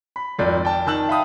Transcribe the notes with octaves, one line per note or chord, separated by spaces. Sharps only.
B5
G#1 F2 D5
D5 G5 A5
D#3 A5 E6 F#7
E5 F5 G5 B5 D#6